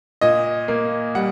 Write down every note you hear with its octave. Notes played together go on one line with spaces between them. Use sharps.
A#2 D#5
A#3
G3 F#5